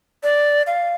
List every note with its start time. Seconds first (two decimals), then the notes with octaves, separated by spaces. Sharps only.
0.23 D5
0.67 F5